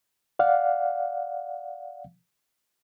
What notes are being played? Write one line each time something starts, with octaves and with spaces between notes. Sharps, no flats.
D5 F5 F#5